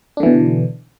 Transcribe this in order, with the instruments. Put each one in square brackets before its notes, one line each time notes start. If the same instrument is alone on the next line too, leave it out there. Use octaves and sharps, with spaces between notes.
[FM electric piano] D4
D3
E3
B2